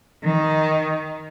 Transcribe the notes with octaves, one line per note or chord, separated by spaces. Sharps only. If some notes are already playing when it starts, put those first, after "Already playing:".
D#3